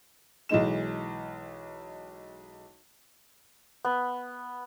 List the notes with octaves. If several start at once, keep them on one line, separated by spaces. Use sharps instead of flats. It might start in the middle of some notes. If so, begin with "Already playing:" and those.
B1 E3 G#3 D#4 E7
B3